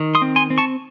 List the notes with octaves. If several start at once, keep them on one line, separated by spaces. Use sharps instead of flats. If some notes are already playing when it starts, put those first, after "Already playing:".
Already playing: D#3
C6 D#6
C4
G#5 C6
C4
A5 C#6